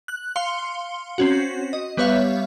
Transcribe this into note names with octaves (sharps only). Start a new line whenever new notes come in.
F#6
F5 C6 C#7 G7
C4 C#4 F#4
D#5
G3 B3 B4 C#5 E5 F5